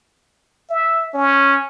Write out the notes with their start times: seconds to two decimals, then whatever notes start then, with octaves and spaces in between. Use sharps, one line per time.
0.70 E5
1.14 C#4